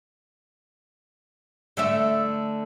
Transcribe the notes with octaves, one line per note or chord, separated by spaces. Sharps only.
D3 A3 E5